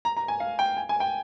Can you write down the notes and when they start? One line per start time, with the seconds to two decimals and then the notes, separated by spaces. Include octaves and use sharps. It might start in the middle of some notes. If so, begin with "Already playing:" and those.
0.05 A#5
0.17 A#5
0.28 G#5
0.40 F5
0.59 G5
0.77 G#5
0.89 G#5
1.00 G5